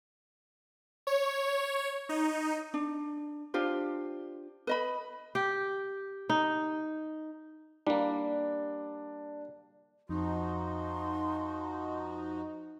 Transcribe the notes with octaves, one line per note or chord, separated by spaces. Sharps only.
C#5
D#4
D4
D4 F4 G4 C5
B4 D#5 B5
G4
D#4
G3 A#3 D4
F2 F3 D#4 F#4 C6